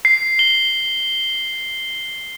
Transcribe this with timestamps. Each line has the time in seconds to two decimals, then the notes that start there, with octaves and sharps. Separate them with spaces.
0.05 C7
0.39 G7